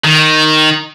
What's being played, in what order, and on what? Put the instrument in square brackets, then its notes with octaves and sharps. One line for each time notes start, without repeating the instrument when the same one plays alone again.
[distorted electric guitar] D#3